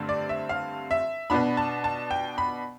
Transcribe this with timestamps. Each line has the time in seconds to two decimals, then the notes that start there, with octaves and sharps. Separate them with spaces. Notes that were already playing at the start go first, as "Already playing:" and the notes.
Already playing: G2 D3 A3 C4
0.09 D5
0.29 E5
0.49 F5
0.91 E5
1.30 B2 B3 D4 B5
1.57 A5
1.84 A5
2.11 G5
2.38 B5